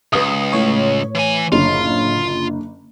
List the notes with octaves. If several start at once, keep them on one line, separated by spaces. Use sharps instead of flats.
C#2 B4 D#6
A2 C#5
E3 G#5
F#1 D3 F4